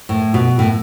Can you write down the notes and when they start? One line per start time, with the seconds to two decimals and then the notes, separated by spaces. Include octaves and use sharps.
0.09 A2
0.34 B2
0.59 A2